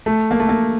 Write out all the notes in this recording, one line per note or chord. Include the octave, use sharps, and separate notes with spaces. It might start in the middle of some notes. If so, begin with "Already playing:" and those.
A3
A#3
A3
A#3